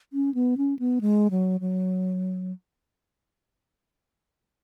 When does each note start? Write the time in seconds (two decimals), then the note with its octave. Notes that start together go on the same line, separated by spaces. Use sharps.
0.13 C#4
0.34 B3
0.57 C#4
0.79 B3
1.01 G#3
1.31 F#3
1.61 F#3